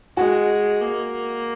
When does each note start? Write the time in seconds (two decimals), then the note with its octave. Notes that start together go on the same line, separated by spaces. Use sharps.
0.17 G#3 F#4
0.81 A#3